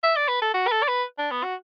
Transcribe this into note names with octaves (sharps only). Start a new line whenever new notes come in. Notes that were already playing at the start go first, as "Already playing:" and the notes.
E5
D5
B4
A4
F#4
B4
A4
D5
B4
D4
B3
F#4